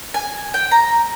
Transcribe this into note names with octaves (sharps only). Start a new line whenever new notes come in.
G#5
G5
A#5